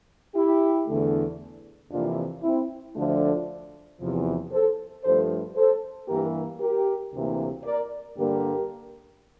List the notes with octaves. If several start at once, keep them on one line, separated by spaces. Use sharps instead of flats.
E4 G4
E2 D3 A3
F2 C3 E3 A#3 D4 F4
C4 E4
D2 D3 F3 A3 D4 F4
E2 C3 F3
A4 C5
G2 F3 A3 A4 C5
A4 C5
G2 E3 A#3 G4 A#4
G4 A#4
D2 C3 E3 A#3
A#4 D5
G2 D3 G3 A#3 G4 A#4